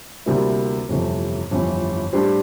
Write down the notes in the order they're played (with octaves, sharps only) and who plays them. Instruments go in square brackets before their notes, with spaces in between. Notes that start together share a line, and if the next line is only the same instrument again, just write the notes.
[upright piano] D2 C3 G3 A#3 E4
G1 F2 C3 E3 A3
G1 F2 E3
A2 G3 D4 G4 C5